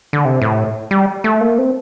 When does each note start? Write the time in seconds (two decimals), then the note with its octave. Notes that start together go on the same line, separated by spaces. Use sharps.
0.13 D3
0.25 C3
0.42 A2
0.91 G3
1.24 A3
1.41 A#3
1.58 C4